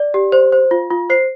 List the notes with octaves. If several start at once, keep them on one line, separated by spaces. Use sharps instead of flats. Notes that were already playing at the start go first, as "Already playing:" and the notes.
Already playing: D5
G4
C5
C5
F4
F4
C5 C7